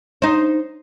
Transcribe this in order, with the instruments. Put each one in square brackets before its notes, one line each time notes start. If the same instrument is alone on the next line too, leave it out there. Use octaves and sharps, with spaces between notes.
[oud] D#4 C5